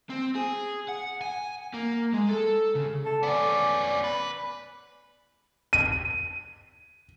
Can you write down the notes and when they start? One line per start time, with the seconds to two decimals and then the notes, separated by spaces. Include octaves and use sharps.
0.10 C4
0.35 G#4
0.88 F#5
1.21 G#5
1.74 A#3
2.14 G#3
2.29 A4
2.75 C#3
3.05 A4
3.23 B3 C#4 D5
4.04 B4
5.73 D#7